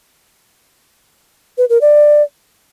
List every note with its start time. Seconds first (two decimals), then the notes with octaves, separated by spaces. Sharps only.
1.58 B4
1.69 A#4
1.81 D5